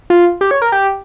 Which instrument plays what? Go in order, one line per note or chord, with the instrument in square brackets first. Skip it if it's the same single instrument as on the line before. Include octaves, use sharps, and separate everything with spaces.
[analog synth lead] F4
G4
C#5
A#4
G4